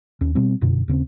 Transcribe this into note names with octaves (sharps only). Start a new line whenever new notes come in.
D#2 C#4
B2 G3 C4
F1 F#2 B2 D3
D#2 C#3 C4